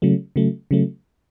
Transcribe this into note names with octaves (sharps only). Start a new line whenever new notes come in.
C#3 F#3 A3
C#3 F#3 A3
C#3 F#3 A3